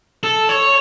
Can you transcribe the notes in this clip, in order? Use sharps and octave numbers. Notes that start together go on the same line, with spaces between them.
A4
C#5